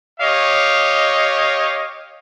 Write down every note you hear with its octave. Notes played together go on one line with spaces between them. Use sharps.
G4 C#5 D#5 F5